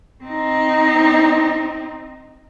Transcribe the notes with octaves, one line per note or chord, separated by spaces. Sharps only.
C4 D#4